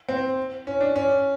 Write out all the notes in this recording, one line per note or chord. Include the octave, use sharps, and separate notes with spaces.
C4
C#4
D4
C#4